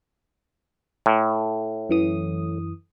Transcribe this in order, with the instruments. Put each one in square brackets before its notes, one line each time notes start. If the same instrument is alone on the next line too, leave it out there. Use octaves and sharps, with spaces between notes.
[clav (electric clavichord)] A2
[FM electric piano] F#2 E3 D#6